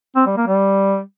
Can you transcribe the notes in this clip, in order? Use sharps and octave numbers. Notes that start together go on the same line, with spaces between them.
C4
G3
A#3
G3